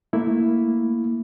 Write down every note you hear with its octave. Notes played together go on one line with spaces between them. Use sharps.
A3 A#3 E4